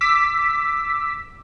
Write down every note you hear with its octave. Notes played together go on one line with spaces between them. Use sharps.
D6 E6 B6